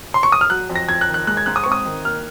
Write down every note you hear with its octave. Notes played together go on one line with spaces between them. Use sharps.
C6
C#6
D#6
F6
F#3 F#6
F2
A#6
F2 G#6
F#6
D#3
F#6
G#3 F#6
G#6
G#2 F#6
D#6
C4 C#6
D#6
D#3
A#3 F6